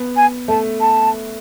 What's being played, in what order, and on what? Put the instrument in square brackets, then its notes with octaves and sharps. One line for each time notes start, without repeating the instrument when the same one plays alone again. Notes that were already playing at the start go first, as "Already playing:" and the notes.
Already playing: [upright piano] B3
[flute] G#5
[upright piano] A3 [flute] A5
[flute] A5